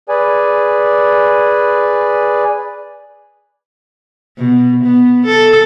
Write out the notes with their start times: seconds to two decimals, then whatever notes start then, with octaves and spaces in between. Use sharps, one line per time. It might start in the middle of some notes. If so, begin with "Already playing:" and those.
0.09 G#4 B4 D5 G#5
4.38 B2
4.84 B3
5.26 A4